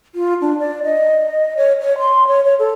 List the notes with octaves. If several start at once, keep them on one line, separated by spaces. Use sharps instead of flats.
F4
D4
D5
D#5
C#5
C#5
C6
C#5
C#5
A4